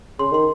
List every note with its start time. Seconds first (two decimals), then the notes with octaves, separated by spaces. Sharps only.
0.19 C#3 C6
0.32 D#3 C6